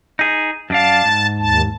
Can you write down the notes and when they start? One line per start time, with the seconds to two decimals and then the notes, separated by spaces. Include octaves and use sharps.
0.19 D#4 G#4
0.70 F#2 D4 F5 A5
1.05 G#2
1.39 D#2 A5